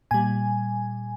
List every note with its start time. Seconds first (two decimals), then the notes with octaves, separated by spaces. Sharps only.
0.11 A#2 G3 G#5